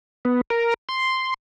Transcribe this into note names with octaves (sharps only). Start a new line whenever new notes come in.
B3
A#4
C6